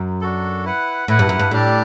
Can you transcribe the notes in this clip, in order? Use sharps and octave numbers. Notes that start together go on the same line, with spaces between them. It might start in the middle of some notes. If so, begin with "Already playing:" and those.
Already playing: F#2
D4 F#4 A4
E4 B4 F#5
A2 E4 B4 F#5
G2
F#2
G2
A2 G3 D4 G4 D5